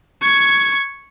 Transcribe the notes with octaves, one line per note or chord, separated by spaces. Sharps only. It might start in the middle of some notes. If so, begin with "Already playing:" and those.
C#6 G#6